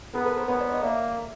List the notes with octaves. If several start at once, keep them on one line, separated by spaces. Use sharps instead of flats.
B3 G#4 A#4
A4 B4
A#4 C5
B3 B4 C#5
C5 D5
C#5 D#5
A#3 D5 E5